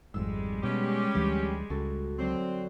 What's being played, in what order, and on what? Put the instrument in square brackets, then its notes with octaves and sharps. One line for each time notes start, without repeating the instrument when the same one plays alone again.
[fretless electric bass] G#1 F2 G#2 [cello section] G3 G#3 [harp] E6
[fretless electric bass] B2 [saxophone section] C#4 G4
[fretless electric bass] D2 E3 F#3
[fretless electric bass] C#2 [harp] F#4 A4
[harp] D3 F#3 [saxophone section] C4